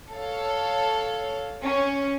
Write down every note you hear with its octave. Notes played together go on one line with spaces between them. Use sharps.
A4 C#5 F5
C#4